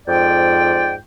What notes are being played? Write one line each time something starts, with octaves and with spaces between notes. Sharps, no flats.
F2 G#2 F4 D5 G5